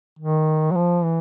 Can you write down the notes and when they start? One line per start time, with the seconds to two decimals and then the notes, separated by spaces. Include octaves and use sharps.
0.19 D#3
0.71 F#3
0.75 F3
1.04 E3